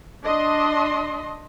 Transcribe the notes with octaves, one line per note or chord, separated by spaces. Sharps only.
D4 D#5 C6